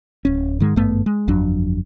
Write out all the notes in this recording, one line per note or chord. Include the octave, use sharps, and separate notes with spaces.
D1 C#4
G#2 D#3 G#3
G#1 G2 A3 B3
G#3
G1 F2 F#3 D4